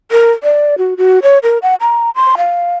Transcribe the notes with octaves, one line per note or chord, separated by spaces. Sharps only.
A#4
D5
F#4
F#4
C#5
A#4
F#5
A#5
C6
F5